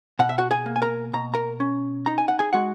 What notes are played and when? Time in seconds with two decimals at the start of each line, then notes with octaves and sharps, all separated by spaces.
0.19 B2 F#5
0.29 E5
0.38 F#4 F#5
0.51 G#4 G#5
0.66 A#3
0.76 G#5
0.82 A#4 A#5
1.13 B2 A#5
1.34 A#4 A#5
1.60 C#4
2.06 D#4 A#5
2.18 G#5
2.28 F#5
2.39 G#4 G#5
2.53 G#3 F#4 F#5